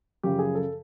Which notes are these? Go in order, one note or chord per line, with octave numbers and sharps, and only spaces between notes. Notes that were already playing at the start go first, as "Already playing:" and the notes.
F#2 C#3 F3 G4
G#4
A4